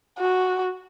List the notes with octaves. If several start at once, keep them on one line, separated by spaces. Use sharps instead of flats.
F#4